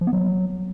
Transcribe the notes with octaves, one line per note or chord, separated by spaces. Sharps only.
F3
B3
F#3